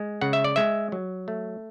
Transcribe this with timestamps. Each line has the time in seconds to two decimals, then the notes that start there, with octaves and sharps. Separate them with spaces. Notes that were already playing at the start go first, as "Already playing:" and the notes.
Already playing: G#3
0.21 C#3 F#5
0.33 E5
0.44 D5
0.56 G#3 E5
0.92 F#3
1.28 A3